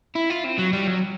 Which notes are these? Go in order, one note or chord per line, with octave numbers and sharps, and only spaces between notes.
E4
F4
C4
F#3
G3
F#3